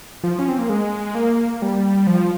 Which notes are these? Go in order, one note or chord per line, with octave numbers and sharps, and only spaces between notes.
F3
C#4
C4
A#3
G#3
A#3
G3
F3